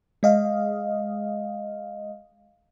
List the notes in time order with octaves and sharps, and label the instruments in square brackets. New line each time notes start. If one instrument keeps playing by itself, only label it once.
[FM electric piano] G#3 D#5 F5